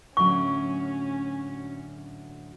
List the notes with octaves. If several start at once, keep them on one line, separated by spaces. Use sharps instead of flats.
A2 D3 F#3 C#4 C#6